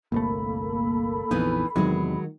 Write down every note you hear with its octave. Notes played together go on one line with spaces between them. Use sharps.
G1 C2 A3 A#3 A4 B5
A#1 F2 E3 B3 D#4
E2 C3 D#3 F#3 G#3